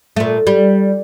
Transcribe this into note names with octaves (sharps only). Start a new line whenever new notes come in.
A#2 A3
G3